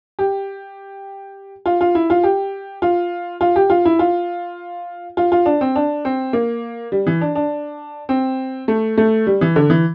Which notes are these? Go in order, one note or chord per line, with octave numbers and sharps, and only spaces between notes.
G4
F4
F4
E4
F4
G4
F4
F4
G4
F4
E4
F4
F4
F4
D4
C4
D4
C4
A#3
G3
E3
D4
D4
C4
A3
A3
G3
E3
D3
E3